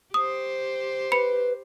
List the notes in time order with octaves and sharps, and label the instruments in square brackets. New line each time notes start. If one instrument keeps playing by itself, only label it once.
[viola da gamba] G4 C5 [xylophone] D#6
[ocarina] B4 [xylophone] B5 C#7